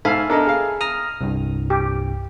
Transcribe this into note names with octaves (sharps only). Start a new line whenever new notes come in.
G#2 A4 E5 F5 G#5 B5
D4 A4 A#4 D#5
G#4 A4 F5
A#5 D#6 F6 A#6
C2 G2
G4